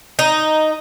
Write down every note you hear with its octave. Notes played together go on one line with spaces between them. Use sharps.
D#4